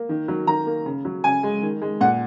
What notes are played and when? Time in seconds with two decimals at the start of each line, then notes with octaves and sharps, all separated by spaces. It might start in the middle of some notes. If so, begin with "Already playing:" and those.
Already playing: A#3
0.09 D#3
0.28 F#3
0.47 D#3 A#5
0.66 A#3
0.86 C#3
1.05 F#3
1.24 C#3 G#5
1.43 G#3
1.62 D#3
1.82 G#3
2.01 A#2 F#5